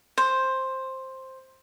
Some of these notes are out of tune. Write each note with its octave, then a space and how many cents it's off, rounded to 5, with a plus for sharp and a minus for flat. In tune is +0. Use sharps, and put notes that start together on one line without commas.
C5 +10